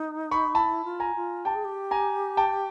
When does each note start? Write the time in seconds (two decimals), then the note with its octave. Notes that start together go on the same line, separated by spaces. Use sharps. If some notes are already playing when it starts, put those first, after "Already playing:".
Already playing: D#4
0.31 B5 C#6
0.55 E4 A5 B5
0.85 F4
1.00 G#5 A#5
1.16 F4
1.45 G4 G5 A5
1.55 G#4
1.65 G4
1.91 G#5 A#5
2.37 G5 A5